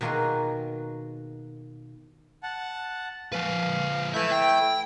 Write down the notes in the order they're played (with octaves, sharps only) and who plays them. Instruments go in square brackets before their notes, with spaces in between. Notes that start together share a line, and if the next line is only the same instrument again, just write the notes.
[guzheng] B2 D#3 A#3 F4 F#4 G#4
[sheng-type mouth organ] F#5 A5
[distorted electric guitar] F3 B4 [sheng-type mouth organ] F5
[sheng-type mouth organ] A3 E4 G6 [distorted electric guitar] B4 E5
[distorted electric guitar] G5